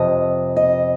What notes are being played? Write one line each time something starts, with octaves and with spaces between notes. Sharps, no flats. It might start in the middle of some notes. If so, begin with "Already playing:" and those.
Already playing: F2 C3 D#5
D#5